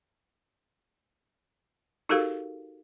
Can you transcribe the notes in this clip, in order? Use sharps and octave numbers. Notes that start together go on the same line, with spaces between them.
D#4 F#4 G4 A4 A#4 F5